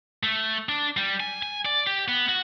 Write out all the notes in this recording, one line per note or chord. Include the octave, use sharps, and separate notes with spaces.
A3
D4
G3
G#5
G#5
D5
G4
B3
F#4